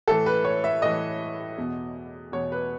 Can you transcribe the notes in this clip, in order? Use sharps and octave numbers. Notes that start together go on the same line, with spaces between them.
A2 E3 A4
B4
C#5
E5
A2 E3 D#5
E2 B2
E2 B2 C#5
B4